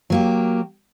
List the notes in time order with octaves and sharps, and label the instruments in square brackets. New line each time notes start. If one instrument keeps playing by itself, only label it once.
[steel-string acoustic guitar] F#3 A#3 G4